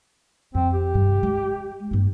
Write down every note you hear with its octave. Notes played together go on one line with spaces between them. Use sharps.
F2 C4
G4
G2 C3
G#3
G2 A#3